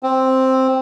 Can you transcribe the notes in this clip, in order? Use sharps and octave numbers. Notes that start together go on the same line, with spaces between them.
C4